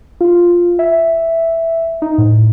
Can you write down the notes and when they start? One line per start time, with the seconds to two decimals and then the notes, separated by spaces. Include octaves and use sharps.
0.21 F4
0.79 E5
2.02 D#4
2.18 A2